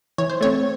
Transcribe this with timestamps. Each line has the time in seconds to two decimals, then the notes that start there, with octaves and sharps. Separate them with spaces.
0.18 E3 C#5
0.29 C5
0.41 A3 C4 C#5